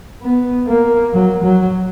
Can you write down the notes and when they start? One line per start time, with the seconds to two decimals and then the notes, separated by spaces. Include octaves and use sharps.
0.22 B3
0.68 A#3
1.13 F#3
1.44 F#3